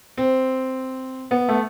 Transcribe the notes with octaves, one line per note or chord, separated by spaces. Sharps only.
C4
B3
A3